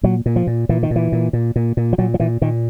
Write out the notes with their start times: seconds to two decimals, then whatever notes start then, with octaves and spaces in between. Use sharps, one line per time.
0.03 A#2 F#3
0.26 A#2
0.36 F3
0.47 A#2
0.69 A#2 E3
0.83 D#3
0.91 A#2 E3
1.12 A#2
1.33 A#2
1.56 A#2
1.77 A#2
1.93 F3
1.98 A#2 F#3
2.14 F3
2.20 A#2 E3
2.41 A#2 D#3